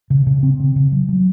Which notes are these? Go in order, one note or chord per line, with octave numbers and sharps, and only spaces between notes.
C#3
C#3
C4
C#3
C#3
F#3
F#3